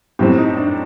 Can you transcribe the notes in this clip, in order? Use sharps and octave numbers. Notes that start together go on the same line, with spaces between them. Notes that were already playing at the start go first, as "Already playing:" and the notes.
A2 F#3 C4 G4
D#4
D4